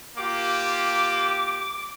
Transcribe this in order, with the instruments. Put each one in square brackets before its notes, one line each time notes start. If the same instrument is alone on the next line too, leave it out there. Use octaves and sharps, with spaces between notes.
[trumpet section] A#3 F4 G4 [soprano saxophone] D6